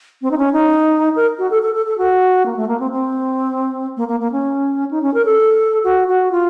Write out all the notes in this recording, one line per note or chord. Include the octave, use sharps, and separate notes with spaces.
C4
D#4
C#4
D#4
A#4
F#4
A4
A4
A4
A4
F#4
A#3
A3
A#3
C4
C4
A#3
A#3
A#3
C#4
D#4
C#4
A#4
A4
F#4
F#4
F4